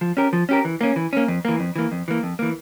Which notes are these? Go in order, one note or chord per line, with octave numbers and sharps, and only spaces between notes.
F3
C#4 G4 A#4
F3
C#4 G4 A#4
E3
A#3 C#4
E3
A#3 C#4
F2
E3 A#3
F2
E3 A#3
F2
E3 A#3
F2
E3 A#3